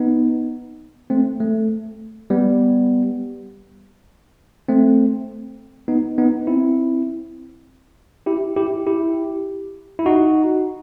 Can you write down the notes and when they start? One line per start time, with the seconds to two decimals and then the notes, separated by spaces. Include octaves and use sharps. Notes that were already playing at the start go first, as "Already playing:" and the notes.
Already playing: B3 D#4
1.10 A3 C4
1.40 A3
2.30 G3 B3
4.68 A3 C4
5.88 B3 D#4
6.18 B3 D#4
6.47 C4 E4
8.26 E4 G4
8.56 E4 G4
8.87 E4 G4
9.99 E4
10.06 D#4 F#4